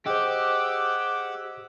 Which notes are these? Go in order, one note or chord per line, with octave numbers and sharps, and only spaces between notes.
G4 G#4 C5 D#5 F#5 D6 E6